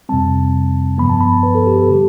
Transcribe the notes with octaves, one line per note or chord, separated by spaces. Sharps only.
F2 C3 G3 C4 A5
G2 F3 B3 B5
A5
B5
A5
B4
A4
G4
A4
D3 G3 G4